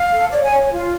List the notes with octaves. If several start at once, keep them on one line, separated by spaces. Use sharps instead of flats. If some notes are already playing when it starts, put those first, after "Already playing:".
Already playing: F5
A4
C#5 D5
G#5
C#5
F4